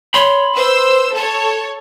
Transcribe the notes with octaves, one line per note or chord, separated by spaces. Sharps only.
C#5 B5 C6
B4 C5 E6
A4 C#5 A5